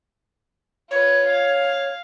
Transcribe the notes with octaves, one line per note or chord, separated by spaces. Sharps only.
F4 B4 C#5
F5